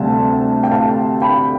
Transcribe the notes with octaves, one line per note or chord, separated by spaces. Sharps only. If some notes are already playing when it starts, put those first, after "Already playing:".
Already playing: D2 C3 G3 F5 A5
G5
F5 A5
G5 B5